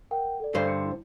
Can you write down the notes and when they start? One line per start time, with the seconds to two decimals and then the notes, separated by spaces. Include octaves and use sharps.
0.11 A#4 F#5 G5
0.40 A4 D5
0.55 G2 D3 C5
0.68 C#7
0.85 E4